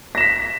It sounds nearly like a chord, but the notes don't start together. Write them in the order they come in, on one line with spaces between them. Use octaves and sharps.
A#6 E7 B6